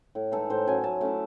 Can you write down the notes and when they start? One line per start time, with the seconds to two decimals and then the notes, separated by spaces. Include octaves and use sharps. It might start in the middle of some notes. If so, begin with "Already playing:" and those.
0.15 A2
0.32 E3 G#3 D#4 A4
0.50 A2 C5
0.67 F#3 C#4 G#5
0.84 F#3 A5
1.01 A3 C#4 E4